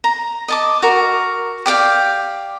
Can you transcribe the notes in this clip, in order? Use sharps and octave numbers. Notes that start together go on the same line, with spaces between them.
A#5
D#5 A5 D6
F#4 A#4
G4 D5 F5 G5